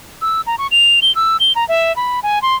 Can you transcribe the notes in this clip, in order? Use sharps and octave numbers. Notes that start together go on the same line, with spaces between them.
E6
A#5
C#6
F7
G7
E6
G7
A#5
E5
B5
G#5
C6